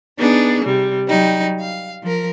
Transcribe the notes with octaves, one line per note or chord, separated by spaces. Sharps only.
B3 D4 D#4 G#4
C3 G3
F#3 G3 D#4
F5
F3 A#4